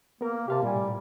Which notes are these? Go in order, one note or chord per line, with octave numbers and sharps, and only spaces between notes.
A#3 B3 A#4
C3 G4 F5 A5
A#2 G3 G#5
A2